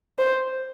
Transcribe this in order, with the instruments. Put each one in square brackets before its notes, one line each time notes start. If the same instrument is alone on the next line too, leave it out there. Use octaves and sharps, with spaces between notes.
[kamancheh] C5